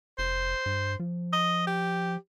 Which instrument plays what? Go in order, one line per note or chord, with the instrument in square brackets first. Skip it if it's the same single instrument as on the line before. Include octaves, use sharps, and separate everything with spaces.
[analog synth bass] F1 [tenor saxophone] C5
[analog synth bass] G2
F3
[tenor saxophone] D#5
G4